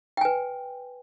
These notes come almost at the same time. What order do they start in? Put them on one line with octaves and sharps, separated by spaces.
G5 G#5 B4